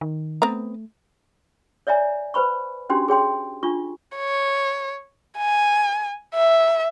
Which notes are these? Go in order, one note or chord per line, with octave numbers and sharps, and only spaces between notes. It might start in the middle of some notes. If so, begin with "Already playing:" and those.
D#3
A3 B3 C4 A#5
C#5 D5 E5 G#5 A#5
B4 C5 B5 C#6
C#4 D4 F#4 G4 C6
G#4 C#5 G5 C6
D4 F4 C#6
C#5
G#5
E5